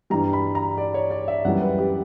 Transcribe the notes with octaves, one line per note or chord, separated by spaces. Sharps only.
G2 E3 G3 A#5
B5
A#5
D5
C#5
D5
E5
F#2 E3 G3 F#5
B4
G4